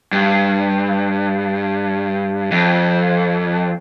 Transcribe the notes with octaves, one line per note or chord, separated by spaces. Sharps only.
G2
F2